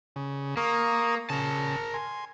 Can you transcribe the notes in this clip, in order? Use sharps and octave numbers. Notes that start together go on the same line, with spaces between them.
C#3
A#3 A#4 C#6 D#6
C#3 A#4 A5
G#5 C6